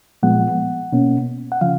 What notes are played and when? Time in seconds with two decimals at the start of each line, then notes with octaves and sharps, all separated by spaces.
0.23 A#2 F3 G#3 B3 F#5
0.92 B2 A#3 C#4
1.52 F#5
1.61 C#3 F3 F5